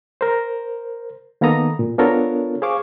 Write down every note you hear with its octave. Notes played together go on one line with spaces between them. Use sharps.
A#4 C5
D#3 A#3 B3 A4 A#5 D#6
A#2
B3 D4 F4 A4 A#4 C#5
G#4 C5 F5 C#6 D6